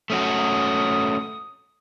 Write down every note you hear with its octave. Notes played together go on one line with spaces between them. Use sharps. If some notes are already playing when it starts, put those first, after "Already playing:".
A3 C#4 F#4 D#6